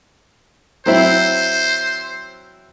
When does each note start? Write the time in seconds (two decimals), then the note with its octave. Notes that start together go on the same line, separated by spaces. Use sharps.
0.86 F#3 C4 E4 C5